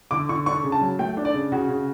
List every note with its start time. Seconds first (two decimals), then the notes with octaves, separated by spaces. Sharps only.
0.11 D3 D6
0.29 D3 C#6
0.46 D4 C#6
0.63 C#3
0.72 A5
0.81 F#3
0.99 A3 G5
1.17 D4
1.25 D5
1.34 C#3
1.52 C#3 F#4
1.69 C#3